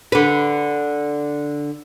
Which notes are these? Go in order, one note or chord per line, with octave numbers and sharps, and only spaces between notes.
D3 B4